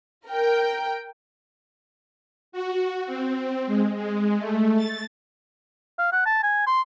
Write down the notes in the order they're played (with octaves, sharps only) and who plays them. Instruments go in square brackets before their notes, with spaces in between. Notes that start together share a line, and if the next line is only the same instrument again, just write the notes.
[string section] A#4 G5
[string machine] F#4
C4
G#3
G#3
A3
A6
[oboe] F5
F#5
A5
G#5
C6